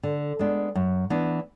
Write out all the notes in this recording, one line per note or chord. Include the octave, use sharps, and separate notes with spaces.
D3
G#3 B3 D4
F#2
E3 B3 D4